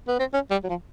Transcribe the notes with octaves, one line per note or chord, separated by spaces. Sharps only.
B3
C4
C#4
G3
F#3
F3